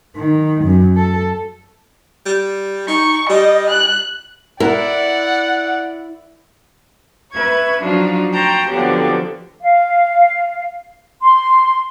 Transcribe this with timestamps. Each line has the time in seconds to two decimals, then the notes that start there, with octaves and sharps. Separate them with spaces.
0.16 D#3
0.64 F#2
0.96 A4
2.26 G3
2.88 D#4 C#6
3.29 G3 D#5
3.70 F#6
4.60 E4 A#4 D5 F#5
7.34 B4 E5 B5 C#6 G#6
7.83 F3 F#3 D4 D#4 F4 F#4
8.34 G5 A5 A#5 C6 C#6 G6
8.70 D3 F3 F#3 B3 C4 G4
9.61 F5
11.21 C6